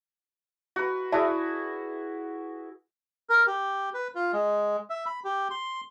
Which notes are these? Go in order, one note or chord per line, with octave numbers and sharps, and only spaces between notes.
F#4 B4
E4 F#4 G#4 D5 E5 A5
A#4
G4
B4
F4
G#3
E5
B5
G4
C6